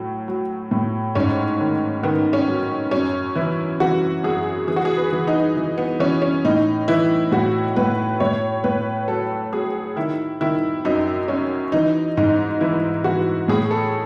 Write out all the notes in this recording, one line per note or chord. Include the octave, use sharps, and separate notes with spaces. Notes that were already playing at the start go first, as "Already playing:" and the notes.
Already playing: A2 F#3
F#3
A2
G#2 C#4
D#3
D#3 B3
C#4
F#3
F#2 C#4
E3 E4
E3 F#4
F#2 G#4
E3 G#4
F#4
G#4
B4
E3
D#4
E3
B3
E3 C#4
C#4
A2 D#4
E3 E4
A2 F#4
A2 B4
A2 C#5
A2 B4
F#3 A4
F#3 G#4
D#3 E4
D#3 E4
F#2 D#4
F#3 C#4
E3 D#4
G#2 D#4
E3 E4
E3 F#4
A2 G#4
A4